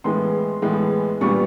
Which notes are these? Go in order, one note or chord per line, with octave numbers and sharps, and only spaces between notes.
A2 E3 G#3 B3 C6
A2 E3 G#3 B3
A#2 G3 B3 C#6